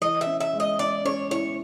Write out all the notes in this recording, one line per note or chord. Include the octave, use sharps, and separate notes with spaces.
E3 D#5
E5
C#4
E5
G#3
D#5
C#4 D5
C#4 C#5
E4 C#5